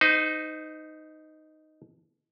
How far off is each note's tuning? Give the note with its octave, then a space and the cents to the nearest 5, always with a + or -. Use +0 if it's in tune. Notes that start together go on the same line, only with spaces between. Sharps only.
D#4 +0 C5 -40